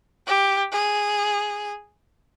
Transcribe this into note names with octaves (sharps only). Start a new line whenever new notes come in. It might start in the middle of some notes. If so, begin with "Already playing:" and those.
G4
G#4